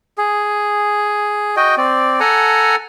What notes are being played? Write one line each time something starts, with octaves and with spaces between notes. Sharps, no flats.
G#4
F#4 D#5 G5
C4 D5
A4 F#5 G#5 A#5